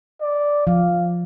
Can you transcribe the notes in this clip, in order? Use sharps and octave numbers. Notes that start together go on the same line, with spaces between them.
D5
F3 F5